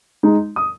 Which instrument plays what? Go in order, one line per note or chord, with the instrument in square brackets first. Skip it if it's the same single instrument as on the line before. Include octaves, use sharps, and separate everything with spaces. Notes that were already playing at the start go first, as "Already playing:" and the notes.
[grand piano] G#3 D#4
D#6